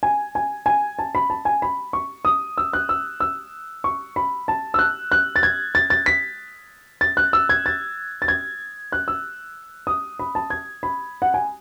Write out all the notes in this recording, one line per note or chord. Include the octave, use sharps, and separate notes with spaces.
G#5
G#5
G#5
A5
B5
A5
G#5
B5
C#6
D#6
E6
F#6
E6
E6
C#6
B5
A5
E6
F#6
F#6
A6
G#6
A6
A6
B6
A6
F#6
E6
G#6
A6
A6
G#6
F#6
E6
D#6
B5
A5
G#6
B5
F#5
G#5